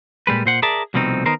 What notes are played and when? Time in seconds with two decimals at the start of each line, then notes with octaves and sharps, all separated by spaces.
0.27 A#2 G3 G#3 B4
0.46 A#2 C5 F#5
0.63 G#4 A#4 D5 E5 A5
0.94 C2 B2 F3 A3 C4 D#4
1.26 D#3 B3 D#4 A#4 C5